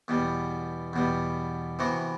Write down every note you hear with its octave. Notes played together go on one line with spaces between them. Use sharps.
E2 B2 G3
E2 B2 G3
C3 E3 B3 F#4